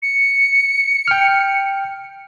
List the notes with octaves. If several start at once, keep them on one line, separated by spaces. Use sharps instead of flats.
C#7
G5 F6